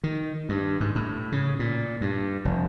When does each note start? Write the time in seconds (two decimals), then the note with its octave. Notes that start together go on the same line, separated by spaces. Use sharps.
0.04 D#3
0.49 G2
0.80 G#2
0.96 A2
1.32 C#3
1.59 A#2
2.01 G2
2.45 F1